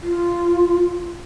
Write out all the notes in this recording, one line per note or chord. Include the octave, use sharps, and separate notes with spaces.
F4